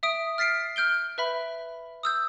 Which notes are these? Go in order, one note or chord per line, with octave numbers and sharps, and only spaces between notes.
E5 D#6 D7
F6 A6 B6 C7 D7
F6 G6 D7 G7
B4 E5 B5
D#6 E6 G6